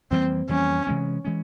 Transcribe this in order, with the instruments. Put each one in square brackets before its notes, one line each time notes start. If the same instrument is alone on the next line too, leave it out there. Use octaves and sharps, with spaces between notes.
[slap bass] F2 E3 G3 A#3 [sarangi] C4
[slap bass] F2 E3 G3 A#3 [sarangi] C#4
[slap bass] C3 E3 G#3 C#4
E3 G#3 C#4